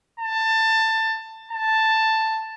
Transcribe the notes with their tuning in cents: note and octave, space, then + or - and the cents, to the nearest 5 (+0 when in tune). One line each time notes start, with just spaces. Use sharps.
A5 +20
A5 +5